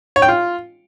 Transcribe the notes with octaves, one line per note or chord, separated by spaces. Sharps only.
C#5
G5
F4